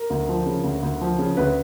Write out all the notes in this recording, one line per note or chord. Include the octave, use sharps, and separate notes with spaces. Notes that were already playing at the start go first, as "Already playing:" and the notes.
Already playing: A#4
D2
F3
C#3
D2
D2
F3
C#3
D2 B4